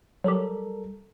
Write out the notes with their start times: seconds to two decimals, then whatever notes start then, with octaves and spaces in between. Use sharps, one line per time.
0.24 F#3 G3 G4 A4 A#4